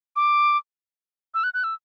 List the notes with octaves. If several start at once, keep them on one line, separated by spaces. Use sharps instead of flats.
D6
E6
F#6
F#6
E6